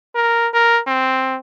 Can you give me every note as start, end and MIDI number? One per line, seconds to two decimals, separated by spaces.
0.15 0.48 70
0.54 0.80 70
0.87 1.37 60